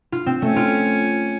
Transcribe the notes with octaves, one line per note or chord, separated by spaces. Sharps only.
F4
C4
A3 C#4
F4